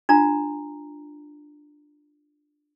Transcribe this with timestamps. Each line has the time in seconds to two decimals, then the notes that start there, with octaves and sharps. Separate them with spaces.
0.09 D4 F4 A#5